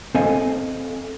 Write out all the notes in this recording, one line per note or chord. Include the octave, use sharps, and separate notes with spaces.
C4 A4 D#5 F5 G#5